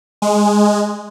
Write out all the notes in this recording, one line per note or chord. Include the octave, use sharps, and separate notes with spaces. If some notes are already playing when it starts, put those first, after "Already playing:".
G#3